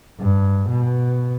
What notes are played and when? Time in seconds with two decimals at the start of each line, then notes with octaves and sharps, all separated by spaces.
0.20 G2
0.69 B2